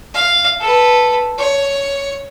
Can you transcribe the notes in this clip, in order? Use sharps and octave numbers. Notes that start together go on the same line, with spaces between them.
F5
A4 B4
C#5